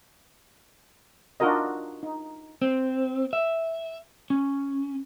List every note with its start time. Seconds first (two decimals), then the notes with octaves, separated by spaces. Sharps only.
1.40 D4 D#4 F4 F#4 A#4 D#5
2.03 D#4
2.62 C4
3.33 E5
4.30 C#4